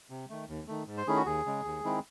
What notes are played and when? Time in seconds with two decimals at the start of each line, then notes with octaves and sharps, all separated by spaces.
0.10 C3
0.29 D#3 A3
0.49 D#2
0.68 D#3 A3
0.87 G#2
0.97 C5
1.07 D#3 A3 C#4 E4 G#4
1.17 F#4
1.26 D#2 G#4
1.46 C#3 G#3
1.65 D#2
1.84 D#3 G#3 C4 E4